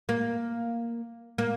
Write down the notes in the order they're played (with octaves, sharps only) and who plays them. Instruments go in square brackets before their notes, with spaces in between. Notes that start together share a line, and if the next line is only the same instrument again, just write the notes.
[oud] A#3
A#3